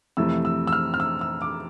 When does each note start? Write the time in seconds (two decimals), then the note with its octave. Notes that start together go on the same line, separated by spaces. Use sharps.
0.17 F2 C3 E3 A3 E6
0.45 E6
0.67 E6
0.73 F6
0.94 F6
1.00 E6
1.21 E6
1.42 D6